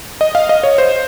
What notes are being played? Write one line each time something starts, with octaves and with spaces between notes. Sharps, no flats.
D#5
F5
D#5
C#5
C5